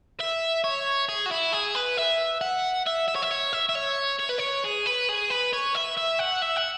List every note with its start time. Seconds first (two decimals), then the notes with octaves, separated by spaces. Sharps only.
0.20 E5
0.64 C#5
1.09 G#4
1.26 F#4
1.31 E4
1.53 G#4
1.75 B4
1.97 E5
2.41 F#5
2.87 E5
3.08 E5
3.16 C#5
3.23 E5
3.31 C#5
3.53 E5
3.69 E5
3.75 C#5
4.20 C#5
4.29 B4
4.39 C#5
4.64 G#4
4.86 B4
5.09 G#4
5.30 B4
5.53 C#5
5.75 E5
5.97 E5
6.19 F#5
6.42 E5
6.56 F#5